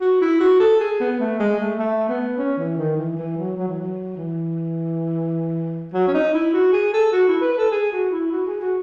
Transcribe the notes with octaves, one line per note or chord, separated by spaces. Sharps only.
F#4
E4
F#4
A4
G#4
B3
A3
G#3
A3
A3
B3
C#4
E3
D#3
E3
E3
F#3
F#3
E3
F#3
E3
F#3
C#4
D#4
E4
F#4
G#4
A4
F#4
E4
B4
B4
A4
G#4
F#4
E4
F#4
G#4
F#4